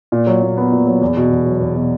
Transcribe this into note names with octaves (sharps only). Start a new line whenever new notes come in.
A#2
F#3
A#2
B3
A#2
F#3
E2
B2
E2
F#3
E2
B2